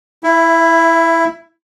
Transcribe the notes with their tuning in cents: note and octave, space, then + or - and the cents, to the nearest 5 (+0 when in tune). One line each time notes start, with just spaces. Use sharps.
E4 +0 E5 +20